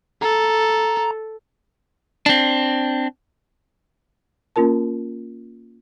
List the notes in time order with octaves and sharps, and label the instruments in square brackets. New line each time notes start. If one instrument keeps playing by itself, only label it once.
[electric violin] A4 [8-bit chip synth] A#5
[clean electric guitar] C4 D4
[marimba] A#3 C#4 F4 A#4 A5